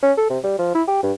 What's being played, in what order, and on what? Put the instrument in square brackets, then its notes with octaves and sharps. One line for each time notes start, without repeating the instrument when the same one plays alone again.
[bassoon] C#4
A4
C3
G3
F3
E4
G4
G2